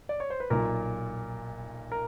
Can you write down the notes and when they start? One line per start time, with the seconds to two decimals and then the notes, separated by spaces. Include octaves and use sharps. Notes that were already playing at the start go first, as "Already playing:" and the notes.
0.09 D5
0.20 C#5
0.30 C5
0.40 B4
0.50 B1 A#2 A#4
1.92 A#4